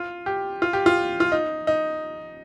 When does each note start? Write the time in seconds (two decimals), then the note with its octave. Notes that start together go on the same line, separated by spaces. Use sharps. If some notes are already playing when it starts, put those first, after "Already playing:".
Already playing: F4
0.26 G4
0.62 F4
0.73 G4
0.86 F4
1.20 F4
1.32 D#4
1.67 D#4